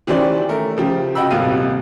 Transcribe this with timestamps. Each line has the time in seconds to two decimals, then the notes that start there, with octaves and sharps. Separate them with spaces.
0.07 D#3 E3 C#4 G4 C5 D5
0.49 A3 A#4
0.77 C#3 F3 G4
1.15 F#4 D#5 G5 B5 E6
1.30 D#1 G#1 C3 A#3 F5 D#7